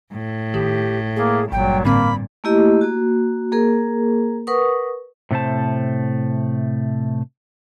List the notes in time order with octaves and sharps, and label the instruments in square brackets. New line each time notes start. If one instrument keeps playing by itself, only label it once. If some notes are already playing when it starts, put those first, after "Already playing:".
[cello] A2
[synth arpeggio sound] G#1 D#3 [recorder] G4
[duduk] A#3 [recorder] G#4
[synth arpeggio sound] G#1 [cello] G2 A#2 [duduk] F#3 [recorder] G5
[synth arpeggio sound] A2 D3 C4 [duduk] A#3 [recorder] B5
[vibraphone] A3 A#3 E4 G4 D#5
A#3 F#4
A#3 G#4 A#4
A#4 B4 F#5 C#6 D#6
[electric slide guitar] A2 C3 A3 C5 A5